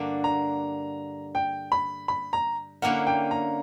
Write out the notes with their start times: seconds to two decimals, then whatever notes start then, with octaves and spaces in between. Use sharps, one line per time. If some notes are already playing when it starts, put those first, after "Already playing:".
Already playing: G2 D3 A#3 D4 F#4
0.24 A#5
1.35 G5
1.72 B5
2.08 B5
2.33 A#5
2.82 D3 A#3 C#4 E4 A#4 F#5
3.07 G5
3.31 A#5